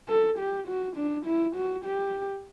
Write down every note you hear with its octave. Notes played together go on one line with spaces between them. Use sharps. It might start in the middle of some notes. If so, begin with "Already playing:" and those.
A4
G4
F#4
D4
E4
F#4
G4